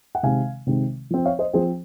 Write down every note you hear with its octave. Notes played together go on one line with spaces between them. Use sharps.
F#5
C3 D#3 G#3 C4 F5 G#5
C3 D#3 G#3 C4
F3 C4
C#5 F5
C5 D#5
F3 C4 G#4 C5